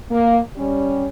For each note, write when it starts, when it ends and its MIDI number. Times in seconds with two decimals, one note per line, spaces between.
0.10 0.39 58
0.56 1.07 55
0.56 1.07 61